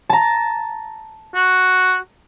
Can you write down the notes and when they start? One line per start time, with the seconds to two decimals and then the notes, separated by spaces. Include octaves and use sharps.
0.10 A5 A#5
1.35 F#4